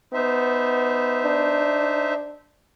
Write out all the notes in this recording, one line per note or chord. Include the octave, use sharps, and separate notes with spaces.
B3 D#4 C5 E5
D4